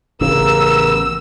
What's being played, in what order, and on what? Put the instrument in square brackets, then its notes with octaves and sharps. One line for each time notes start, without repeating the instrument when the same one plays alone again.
[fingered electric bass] A1 [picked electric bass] C#3 [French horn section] B3 G4 A#4 [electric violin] E6